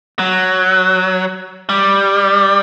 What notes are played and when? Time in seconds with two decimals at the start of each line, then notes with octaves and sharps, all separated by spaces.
0.19 F#3
1.69 G3